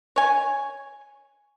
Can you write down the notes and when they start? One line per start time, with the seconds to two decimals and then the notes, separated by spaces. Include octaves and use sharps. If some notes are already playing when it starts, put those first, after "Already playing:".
0.16 C#5 G#5